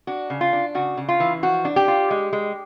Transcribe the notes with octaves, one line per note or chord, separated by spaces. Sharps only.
D4 F#4
C#3
F4
D4
C#3 F#4
C#3
F4
E3
F3 F#4
D4
G4
F4
G#3
G#3